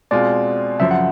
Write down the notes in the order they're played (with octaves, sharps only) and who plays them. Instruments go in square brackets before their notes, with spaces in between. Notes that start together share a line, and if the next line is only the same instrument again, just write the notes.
[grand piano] B2 G#3 C4 F4 [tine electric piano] D5
[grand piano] F#2 C#3 F3 [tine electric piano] E5
[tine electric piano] F#5